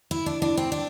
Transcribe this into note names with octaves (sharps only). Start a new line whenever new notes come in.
E4
D4
D4
C4
D4